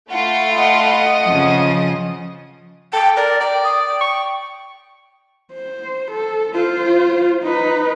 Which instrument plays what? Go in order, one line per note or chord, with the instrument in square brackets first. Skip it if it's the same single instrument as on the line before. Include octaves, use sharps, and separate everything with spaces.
[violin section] A3 F4 B5 [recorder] F#5
[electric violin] D#5 [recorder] F#5
[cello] C#3 F3
[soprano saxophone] A4 [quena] G5
[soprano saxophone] A#4 [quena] D5
[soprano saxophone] D5 [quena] G5
[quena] D#6
G5
[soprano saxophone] C#6
[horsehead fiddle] C5
A4
F4 C5
D#4 B4